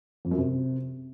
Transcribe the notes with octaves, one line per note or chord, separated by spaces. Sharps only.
F2
F#2
C3